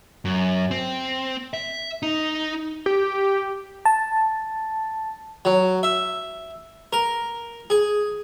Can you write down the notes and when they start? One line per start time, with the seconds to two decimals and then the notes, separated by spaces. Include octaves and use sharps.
0.25 F#2
0.71 C4
1.54 E5
2.03 D#4
2.86 G4
3.85 A5
5.45 F#3
5.83 E5
6.93 A#4
7.70 G#4